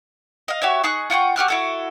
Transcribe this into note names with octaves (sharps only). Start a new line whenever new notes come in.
D#5 F5
F#4 G4 C#5 E5
D#4 G#4 C#6 F#6
F4 F#5 G5 C#6
F#4 G4 F6 F#6
E4 F#4 A4